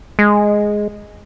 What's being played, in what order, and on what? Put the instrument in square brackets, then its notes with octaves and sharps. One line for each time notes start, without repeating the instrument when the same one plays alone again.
[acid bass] G#3